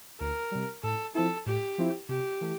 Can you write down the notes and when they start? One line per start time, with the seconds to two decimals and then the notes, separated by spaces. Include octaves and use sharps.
0.20 D2 A#4
0.51 C3 G3
0.83 A2 A4
1.15 F3 C4 E4 A4
1.46 A2 G4
1.78 F3 C4 E4
2.09 C3 G4
2.41 E3 A3